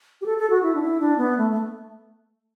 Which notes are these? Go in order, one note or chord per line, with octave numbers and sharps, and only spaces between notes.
G4
A4
A4
F#4
E4
D4
E4
D4
B3
A3
A3